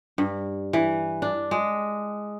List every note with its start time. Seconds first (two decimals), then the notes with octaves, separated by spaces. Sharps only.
0.18 G2
0.73 E3
1.22 D4
1.51 G#3